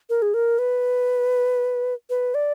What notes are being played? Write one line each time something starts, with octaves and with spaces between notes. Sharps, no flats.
A#4
G#4
A#4
B4
B4
D5